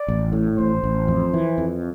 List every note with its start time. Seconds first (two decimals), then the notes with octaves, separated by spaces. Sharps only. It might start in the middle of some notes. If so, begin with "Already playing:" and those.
Already playing: D5
0.08 A1
0.33 A2
0.57 A1 C5
0.84 A1
1.08 F2
1.34 E3
1.58 F2